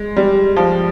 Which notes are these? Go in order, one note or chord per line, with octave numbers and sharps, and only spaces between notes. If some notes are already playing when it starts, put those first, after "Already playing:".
Already playing: G#3
G3
F3